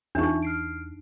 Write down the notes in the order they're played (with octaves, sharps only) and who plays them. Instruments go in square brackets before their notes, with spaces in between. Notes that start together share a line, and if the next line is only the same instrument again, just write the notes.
[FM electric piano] E2 [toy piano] D4 D#4 [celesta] F4 E5 C#6
[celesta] F6 C7 D7